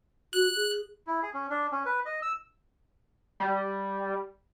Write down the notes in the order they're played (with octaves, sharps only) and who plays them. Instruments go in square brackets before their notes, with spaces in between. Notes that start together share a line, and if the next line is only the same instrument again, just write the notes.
[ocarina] F#4 [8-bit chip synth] F#6
[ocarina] G#4
[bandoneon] E4
G#4
C#4
D4
C#4
B4
D#5
E6
[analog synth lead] G3